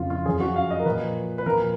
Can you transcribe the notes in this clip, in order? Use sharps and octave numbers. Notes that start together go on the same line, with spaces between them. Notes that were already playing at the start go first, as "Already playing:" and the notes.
Already playing: F2 C#3 F3 F4
F4
F#2 F3 G#4
F#4
F5
D#5
A#4
A#2 F3 B4
B4
A#2 F3 A#4